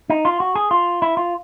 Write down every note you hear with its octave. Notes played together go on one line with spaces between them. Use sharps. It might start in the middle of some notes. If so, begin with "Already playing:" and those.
D#4
F4
F#4
G#4
F4
E4
F4